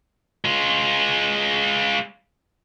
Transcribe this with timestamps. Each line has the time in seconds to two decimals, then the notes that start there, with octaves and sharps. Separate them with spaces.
0.45 G#3 F4